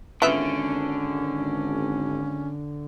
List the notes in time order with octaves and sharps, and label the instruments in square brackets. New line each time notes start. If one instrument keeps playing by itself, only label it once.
[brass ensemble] G#1 [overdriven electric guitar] D3 [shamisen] B3 F4 E5 [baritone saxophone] C#4